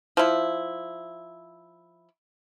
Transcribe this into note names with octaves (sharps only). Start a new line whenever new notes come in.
F3 E4